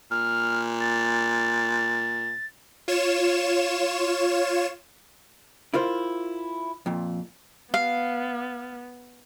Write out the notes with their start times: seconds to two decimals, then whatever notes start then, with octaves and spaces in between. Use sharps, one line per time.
0.11 A#2 F6
0.80 A6
2.88 F4 C#5 E7
5.74 E4 F4 A#4 C5
6.86 F2 A#2
7.74 B3 F5